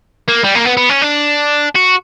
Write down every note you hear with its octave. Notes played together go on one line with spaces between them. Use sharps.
A#3
G3
A#3
B3
B3
C#4
D4
F#4